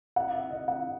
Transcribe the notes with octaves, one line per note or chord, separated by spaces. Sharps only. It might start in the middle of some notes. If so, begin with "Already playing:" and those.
F#5
E5
D#5
F#5